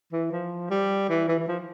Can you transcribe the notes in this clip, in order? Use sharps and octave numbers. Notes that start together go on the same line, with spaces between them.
E3
F3
G3
E3
E3
E3
F3